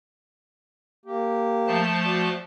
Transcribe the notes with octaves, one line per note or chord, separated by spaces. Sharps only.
A#3 G4
F3 A3 A5
F#4 D5